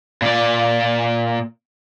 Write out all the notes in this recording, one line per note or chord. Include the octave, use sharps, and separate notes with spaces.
A#2 D5